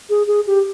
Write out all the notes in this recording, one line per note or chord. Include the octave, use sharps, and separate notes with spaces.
G#4
G#4
G4